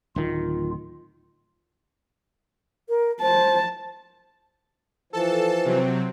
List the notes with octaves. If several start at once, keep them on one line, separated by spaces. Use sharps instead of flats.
D1 D#3 F4
A#4
C5 A5
E3 F3 A4 A5
C3 F#3 C4